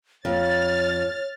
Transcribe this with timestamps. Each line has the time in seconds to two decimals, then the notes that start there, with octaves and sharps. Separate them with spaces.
0.25 F2 C#5 F6 A6